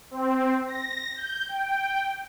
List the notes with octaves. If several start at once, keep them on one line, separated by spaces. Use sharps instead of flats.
C4
A#6
G6
G5